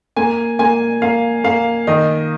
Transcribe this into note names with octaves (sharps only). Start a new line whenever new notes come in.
A#3 G#5
A#3 G#5
A#3 F5
A#3 F5
D#3 D#5